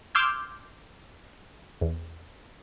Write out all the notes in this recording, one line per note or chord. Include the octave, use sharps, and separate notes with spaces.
C6 D6 E6 F6 G6 G#6
E2